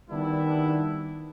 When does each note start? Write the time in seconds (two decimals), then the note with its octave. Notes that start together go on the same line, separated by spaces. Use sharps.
0.10 D#3 G3 B3 D4 E4